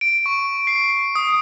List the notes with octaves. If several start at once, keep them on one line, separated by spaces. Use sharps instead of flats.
D7
C#6
C7
D#6